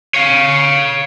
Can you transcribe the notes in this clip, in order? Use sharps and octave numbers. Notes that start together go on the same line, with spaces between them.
C#5 F5